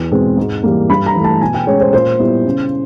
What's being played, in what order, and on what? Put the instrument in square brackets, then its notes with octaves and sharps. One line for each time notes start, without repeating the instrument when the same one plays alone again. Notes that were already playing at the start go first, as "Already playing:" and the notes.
Already playing: [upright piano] E2
B2 G#3 C4
G#2
E3 G3 A#3
G2 B5
A#5
E3 A3
A5
B2 G#5
G5
G#3 C#4 C#5
C5
A#2 C5
G3 B3 E4
C#3